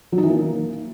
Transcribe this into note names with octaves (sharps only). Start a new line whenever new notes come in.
F#3
D#4
E3
A#3